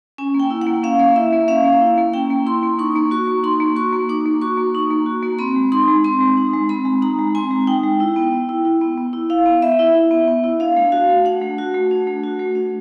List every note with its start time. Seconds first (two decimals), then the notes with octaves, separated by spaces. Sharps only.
0.18 C#4 G#5
0.34 A#3
0.40 G5
0.50 E4
0.62 F#5
0.67 A#3
0.83 C#4 F5
0.99 A#3
1.16 E4 E5
1.33 A#3
1.48 C#4 F5
1.64 A#3
1.81 E4
1.98 A#3
2.13 C#4 G5
2.30 A#3
2.46 E4 C6
2.63 A#3
2.79 D#4 C#6
2.96 A#3
3.11 F#4 C#6
3.28 A#3
3.43 D#4 C6
3.60 A#3
3.76 F#4 C#6
3.93 A#3
4.09 D#4 D6
4.26 A#3
4.41 F#4 C#6
4.58 A#3
4.75 D#4
4.91 A#3
5.06 F#4
5.22 A#3
5.39 C4 B5
5.56 G#3
5.72 D#4 C6
5.88 G#3
6.05 C4 C6
6.20 G#3
6.37 D#4
6.53 G#3
6.69 C4 B5
6.85 G#3
7.02 D#4 A#5
7.19 G#3
7.35 C4 G#5
7.51 G#3
7.67 D#4 G5
7.84 G#3
8.00 E4
8.16 B3
8.33 B3
8.49 E4
8.65 E4
8.81 B3
8.98 B3
9.13 E4
9.30 E4 F5
9.46 B3
9.62 B3 E5
9.79 E4
9.95 E4
10.11 B3
10.28 B3
10.44 E4
10.60 D4 F5
10.76 A3
10.92 F#4 F5
11.10 A3
11.25 D4 F#5
11.42 A3
11.58 F#4
11.74 A3
11.91 D4
12.07 A3
12.24 F#4
12.39 A3
12.55 D4